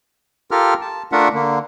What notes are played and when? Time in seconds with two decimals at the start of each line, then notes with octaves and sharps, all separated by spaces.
0.51 F4 G4 A4 A#4 F6
0.81 A5
1.12 A3 D4 F4 A#4 E5 F#5
1.34 D3 A#3